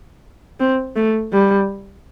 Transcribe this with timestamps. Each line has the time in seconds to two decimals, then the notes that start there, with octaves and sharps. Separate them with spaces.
0.60 C4
0.96 A3
1.33 G3